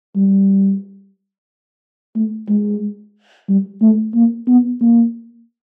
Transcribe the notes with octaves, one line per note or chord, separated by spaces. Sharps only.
G3
A3
G#3
G3
A3
A#3
B3
A#3